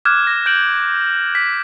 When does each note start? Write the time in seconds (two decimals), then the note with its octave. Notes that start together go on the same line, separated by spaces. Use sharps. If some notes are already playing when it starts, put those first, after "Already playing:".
0.05 D6 F6 F#6 G#6 E7
0.27 A#6
0.46 G6 D7 F#7
1.35 B6